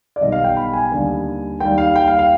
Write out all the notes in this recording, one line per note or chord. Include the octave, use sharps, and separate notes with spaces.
D5
B1 B2 G3 D#5
F5
G5
B5
G#5
D#2 D3 G3
D#2 D#3 G3 G5
F5
G5
F5
F5